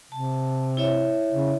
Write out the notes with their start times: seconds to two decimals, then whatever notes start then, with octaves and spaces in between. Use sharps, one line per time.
0.12 C3 A5
0.77 E4 C#5 E5
1.32 C#3